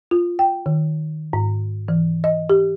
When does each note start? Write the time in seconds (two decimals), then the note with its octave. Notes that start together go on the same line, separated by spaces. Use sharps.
0.11 F4
0.39 G5
0.66 D#3
1.33 G#2
1.88 E3
2.24 D#5
2.50 G4